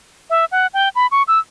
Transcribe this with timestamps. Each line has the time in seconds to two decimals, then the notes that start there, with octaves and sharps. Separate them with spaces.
0.30 E5
0.52 F#5
0.74 G5
0.95 B5
1.11 C#6
1.28 E6